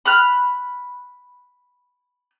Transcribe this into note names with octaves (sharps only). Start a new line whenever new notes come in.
B5 F6 F#6